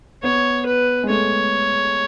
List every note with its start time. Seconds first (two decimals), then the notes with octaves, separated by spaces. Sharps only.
0.23 B3 C#5
0.67 B4
1.03 G#3
1.09 A3 C#5